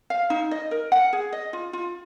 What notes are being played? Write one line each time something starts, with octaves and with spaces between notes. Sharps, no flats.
F5
D#4
D#5
A#4
F#5
G#4
D#5
F4
F4